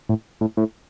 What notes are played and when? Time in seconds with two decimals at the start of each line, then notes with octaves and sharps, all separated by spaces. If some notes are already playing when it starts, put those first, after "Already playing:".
0.09 A2
0.41 A2
0.57 A2